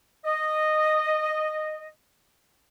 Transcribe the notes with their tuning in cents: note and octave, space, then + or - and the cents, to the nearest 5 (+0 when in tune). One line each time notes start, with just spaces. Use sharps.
D#5 -10